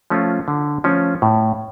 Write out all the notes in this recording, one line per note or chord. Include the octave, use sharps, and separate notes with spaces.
F3 A3 C#4 F4
D3
F3 A3 C#4 F4
A2